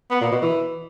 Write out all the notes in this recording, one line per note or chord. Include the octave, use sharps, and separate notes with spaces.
B3
A#2
B2
E3